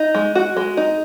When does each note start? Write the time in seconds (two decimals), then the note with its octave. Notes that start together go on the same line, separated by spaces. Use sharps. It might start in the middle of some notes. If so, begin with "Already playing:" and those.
Already playing: D#4
0.15 G#3
0.35 F#4
0.57 G#3
0.77 D#4